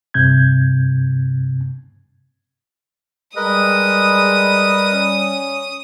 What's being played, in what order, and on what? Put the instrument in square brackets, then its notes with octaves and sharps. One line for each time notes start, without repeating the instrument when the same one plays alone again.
[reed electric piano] G2 C3 G6 G#6
[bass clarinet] G3 [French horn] G#3 [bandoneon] A#4 B4 D#5 [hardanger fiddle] D#6
[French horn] C#4